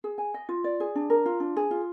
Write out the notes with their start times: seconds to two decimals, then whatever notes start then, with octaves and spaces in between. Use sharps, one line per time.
0.04 G#4
0.18 G#5
0.34 D#5
0.49 F4
0.64 D5
0.80 G#4
0.95 D4
1.10 A#4
1.26 F4
1.40 D4
1.56 G#4
1.71 F4